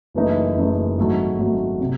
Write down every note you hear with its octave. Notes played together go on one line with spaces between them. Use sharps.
F#1 F#2 E3 A3 D#4
F#1 F#2 E3 A3 D#4
G#1 G#2 F#3 A3
G#1 G#2 F#3 A3
C3